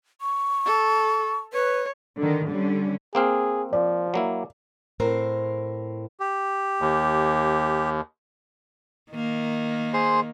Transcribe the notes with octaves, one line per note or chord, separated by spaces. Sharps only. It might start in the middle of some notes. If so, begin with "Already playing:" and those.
C#6
A4
B4 C#5
D3 D#3
D3 G3 C#4
A#3 C4 G#4 F5
F3 D5
F#3 A#3 E4
A2 C4 A#4 C5
G4
D#2
D#3 A#3
G#4 C5 C6